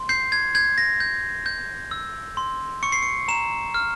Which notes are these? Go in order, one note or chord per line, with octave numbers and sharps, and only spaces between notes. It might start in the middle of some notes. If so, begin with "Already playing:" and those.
Already playing: C6
G6 C7
G#6
G6 G#6
A#6
G6
G6
E6
C6
C#6 C#7
C7
C#7
A#5 E7
F6